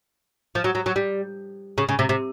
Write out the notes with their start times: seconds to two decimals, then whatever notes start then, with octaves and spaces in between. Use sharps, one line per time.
0.55 F3
0.64 F#3
0.75 F#3
0.86 F#3
0.96 G3
1.78 C#3
1.89 C#3
1.99 C3
2.09 C3